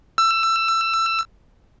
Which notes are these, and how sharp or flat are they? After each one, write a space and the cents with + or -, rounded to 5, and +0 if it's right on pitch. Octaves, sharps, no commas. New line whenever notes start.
E6 +20